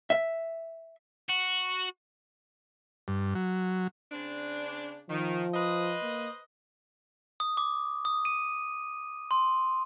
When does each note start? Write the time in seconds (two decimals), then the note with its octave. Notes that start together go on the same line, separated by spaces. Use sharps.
0.10 E5
1.29 F#4
3.08 G2
3.35 F#3
4.11 C#3 C4 D4
5.09 D#3 F3
5.54 B4 C5 D#5
6.03 A#3
7.40 D#6
7.57 D6
8.05 D#6
8.25 D#7
9.31 C6